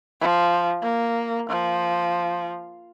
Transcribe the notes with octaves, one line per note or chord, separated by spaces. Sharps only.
F3
A#3
F3